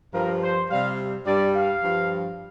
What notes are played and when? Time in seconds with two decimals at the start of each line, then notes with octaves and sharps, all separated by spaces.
0.13 G2 F3 A#4
0.42 C5
0.70 C3 G3 F5
1.27 G2 G3 D5
1.55 F5
1.84 G2 F3